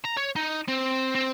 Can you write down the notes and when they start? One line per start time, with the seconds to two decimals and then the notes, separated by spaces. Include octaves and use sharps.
0.04 A#5
0.17 C#5
0.36 D#4
0.68 C4
1.15 C4